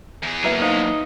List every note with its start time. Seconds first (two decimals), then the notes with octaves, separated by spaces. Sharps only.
0.23 E2 G#4
0.44 F#3 A#3 E4 B4 E5
0.62 D#4 C5 F5